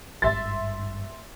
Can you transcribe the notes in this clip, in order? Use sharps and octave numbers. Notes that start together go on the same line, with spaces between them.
G#1 G2 E5 C6 A6